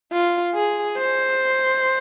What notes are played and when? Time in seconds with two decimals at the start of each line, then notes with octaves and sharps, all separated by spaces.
0.12 F4
0.55 G#4
0.97 C5